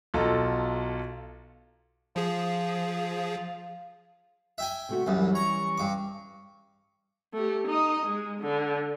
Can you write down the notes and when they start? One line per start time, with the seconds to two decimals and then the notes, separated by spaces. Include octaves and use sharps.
0.14 B1 F4 A4 A#5
2.16 F3 F4 G#4
4.58 E5 G5 G#5
4.89 C3 A3 F#4
5.06 C2 F#2 E3 G3 C#4
5.35 A#5 C#6
5.78 G2 D6
7.33 A3 G4
7.67 D#4 D#5
8.06 G#3
8.40 D3